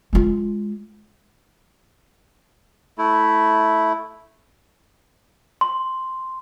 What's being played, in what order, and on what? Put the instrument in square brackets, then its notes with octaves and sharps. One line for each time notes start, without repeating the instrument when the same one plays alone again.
[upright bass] G#3 F4
[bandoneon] A3 E4
[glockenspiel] C6